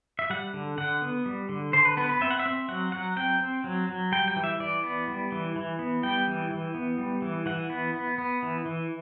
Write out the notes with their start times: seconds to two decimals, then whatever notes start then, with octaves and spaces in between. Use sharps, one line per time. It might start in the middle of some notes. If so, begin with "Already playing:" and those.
0.19 E5
0.30 G3 F#5
0.54 D3
0.78 D3 F#5
1.02 B3
1.26 G3
1.49 D3
1.73 D3 C5
1.85 B4
1.97 B3 B4
2.09 B4
2.21 C4 E5
2.31 F#5
2.39 E5
2.46 C4
2.68 F#3 F#5
2.92 F#3 F#5
3.17 C4 G5
3.41 C4
3.64 F#3
3.89 F#3
4.12 G3 G5
4.28 G5
4.36 E3
4.44 E5
4.60 E3 D5
4.83 B3
5.08 G3
5.32 E3
5.56 E3
5.79 B3
6.03 G3 G5
6.27 E3
6.51 E3
6.75 B3
6.98 G3
7.22 E3
7.46 E3 F#5
7.70 B3
7.94 B3
8.18 B3
8.43 E3
8.66 E3